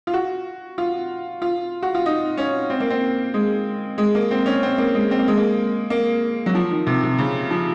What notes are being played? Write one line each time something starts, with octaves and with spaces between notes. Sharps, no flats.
F4
F#4
F4
F4
F#4
F4
D#4
C#4
C4
A#3
C4
G#3
G#3
A#3
C4
C#4
C4
A#3
G#3
C4
A#3
G#3
A#3
A#3
F#3
F3
D#3
C3
C3
C#3
F3